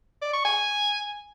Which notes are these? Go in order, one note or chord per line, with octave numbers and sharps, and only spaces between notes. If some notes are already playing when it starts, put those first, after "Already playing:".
D5
C#6
G#5